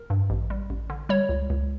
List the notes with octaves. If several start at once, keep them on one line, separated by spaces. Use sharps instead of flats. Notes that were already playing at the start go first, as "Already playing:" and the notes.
Already playing: A#4
G2
A1
G3
A1
D3
G3 C#5
C#2
C#2